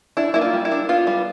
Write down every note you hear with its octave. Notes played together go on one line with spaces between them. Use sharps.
D4 E4
A#3 E4
F4
G3
E4
D4
B3 F4
G3